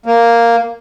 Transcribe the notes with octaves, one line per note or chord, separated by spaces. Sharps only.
A#3